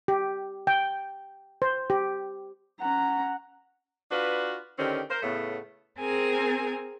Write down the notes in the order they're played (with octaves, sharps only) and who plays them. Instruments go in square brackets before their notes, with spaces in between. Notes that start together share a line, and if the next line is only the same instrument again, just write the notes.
[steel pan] G4
G5
C5
G4
[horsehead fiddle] C#4 A#5 [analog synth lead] F#5
[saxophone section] D4 F4 F#4 B4
D3 D#3 C4 C#4 G4
A#4 C5
A2 C#3 A3 B3
[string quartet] C4 G#4 A#4 G#5